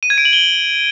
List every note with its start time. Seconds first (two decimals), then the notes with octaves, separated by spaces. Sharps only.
0.03 D#7
0.10 G#6
0.18 D7
0.25 F#7
0.33 G7